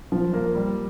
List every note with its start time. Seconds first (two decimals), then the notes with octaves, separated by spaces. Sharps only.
0.12 F3
0.33 A#3
0.55 G3